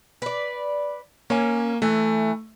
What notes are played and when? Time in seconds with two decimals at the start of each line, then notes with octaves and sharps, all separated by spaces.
0.22 B4 D5
1.30 A#3 C#4 G#5
1.82 E3 A3